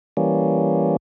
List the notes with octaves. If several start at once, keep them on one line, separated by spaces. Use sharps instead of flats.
E3 G3 A#3 C#4